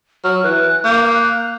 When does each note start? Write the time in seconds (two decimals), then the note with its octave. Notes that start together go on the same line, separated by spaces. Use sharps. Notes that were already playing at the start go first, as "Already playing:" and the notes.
0.24 F#3 F6
0.44 E3 F#6
0.85 A#3 G6
1.15 F#6